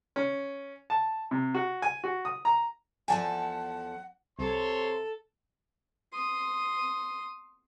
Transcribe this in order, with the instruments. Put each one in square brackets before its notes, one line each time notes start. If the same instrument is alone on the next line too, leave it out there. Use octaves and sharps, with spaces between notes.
[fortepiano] C#4
A5
C3
F#4
G#5
F#4
D#6
A#5
[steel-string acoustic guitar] E2 F3 A4 [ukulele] D5 G#5 [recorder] F#5
[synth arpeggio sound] C2 [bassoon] C3 [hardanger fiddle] A4 [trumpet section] C#5 C6
[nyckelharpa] C6 D#6